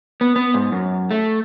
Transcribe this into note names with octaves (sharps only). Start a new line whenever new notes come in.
B3
B3
G#2
F#2
A3